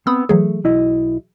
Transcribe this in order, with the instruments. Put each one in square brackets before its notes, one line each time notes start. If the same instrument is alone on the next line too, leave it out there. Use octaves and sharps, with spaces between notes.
[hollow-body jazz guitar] B3 C4 [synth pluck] B5 D#6 E6
[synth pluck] E3 F#3 G#4 [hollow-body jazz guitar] A3
[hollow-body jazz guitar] B1 E4 D#5